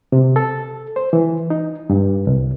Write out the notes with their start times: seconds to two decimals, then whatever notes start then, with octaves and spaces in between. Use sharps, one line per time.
0.12 C3
0.36 A4
0.96 C5
1.13 E3
1.50 D#4
1.90 G2
2.27 C2